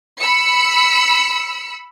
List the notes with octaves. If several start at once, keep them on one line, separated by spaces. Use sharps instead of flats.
B5 E6 C#7